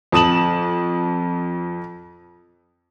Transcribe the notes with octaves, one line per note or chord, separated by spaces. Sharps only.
F2 A5 D#6 E7 F#7